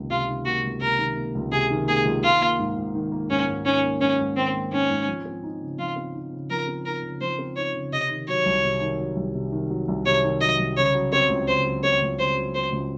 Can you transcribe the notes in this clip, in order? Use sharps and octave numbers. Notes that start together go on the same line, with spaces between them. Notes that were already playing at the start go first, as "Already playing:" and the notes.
Already playing: C#2 C3 D#3 A#3
C3 F4
D#3
A#3 F#4
C#2
C3 A#4
D#3
A#3
C#2
C3 G#4
D#3
A#3 G#4
C#2
D#3 F4
A#3
G#2
G#2
D#3
A#3
G#2 C#4
G#2
D#3 C#4
A#3
G#2 C#4
G#2
D#3 C4
A#3
G#2 C#4
G#2
F3
C4
D#4
C#3
F3 F4
C4
D#4
C#3
F3 A#4
C4
D#4 A#4
C#3
F3 C5
C4
D#4 C#5
C#3
C3 D#5
D#3
F#3 C#5
C2
C3
D#3
F#3
C2
C3
D#3
F#3
C2
C3 C#5
D#3
F#3 D#5
C2
C#3 C#5
F#3
C4 C#5
C#2
C#3 C5
F#3
C4 C#5
C#2
C#3 C5
F#3
C4 C5
C#2